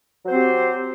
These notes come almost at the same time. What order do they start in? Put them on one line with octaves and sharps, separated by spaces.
F#3 C5 C4 G4